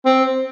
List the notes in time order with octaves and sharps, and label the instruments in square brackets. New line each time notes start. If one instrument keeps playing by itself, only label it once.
[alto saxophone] C4